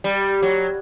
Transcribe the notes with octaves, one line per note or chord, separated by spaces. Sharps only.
G3
F#3